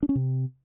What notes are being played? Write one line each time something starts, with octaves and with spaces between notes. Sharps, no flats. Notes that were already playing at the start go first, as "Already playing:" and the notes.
D4
C#4
C3